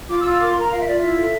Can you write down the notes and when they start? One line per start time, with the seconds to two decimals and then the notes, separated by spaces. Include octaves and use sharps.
0.08 F4 D6
0.19 E6
0.24 F4
0.29 E6
0.40 A#4 D6
0.50 A#4 C6
0.60 A#5
0.71 F4 F5
0.80 E5
0.87 F4 D5
0.98 E4 E5
1.17 A4